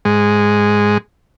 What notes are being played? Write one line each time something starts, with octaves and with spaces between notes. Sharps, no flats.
G#2 G#3